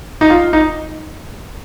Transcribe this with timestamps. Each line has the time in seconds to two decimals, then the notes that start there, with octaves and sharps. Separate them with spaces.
0.21 D#4
0.30 F4
0.53 D#4